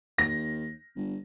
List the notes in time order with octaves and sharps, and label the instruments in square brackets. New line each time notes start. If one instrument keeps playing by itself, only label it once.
[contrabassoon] D#2 [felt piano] A#6
[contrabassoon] G1